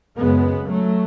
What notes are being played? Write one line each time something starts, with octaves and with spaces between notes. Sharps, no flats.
F#2 C#3 G#3 B3
F#3 A3